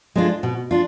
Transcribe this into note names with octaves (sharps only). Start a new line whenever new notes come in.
G#3 D4 F4
B2
D4 F4